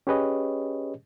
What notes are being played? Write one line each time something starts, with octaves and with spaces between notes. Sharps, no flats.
C#4 G4 G#4 B4 C#5 D#5